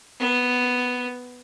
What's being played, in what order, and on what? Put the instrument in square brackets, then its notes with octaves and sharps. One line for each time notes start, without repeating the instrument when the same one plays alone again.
[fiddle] B3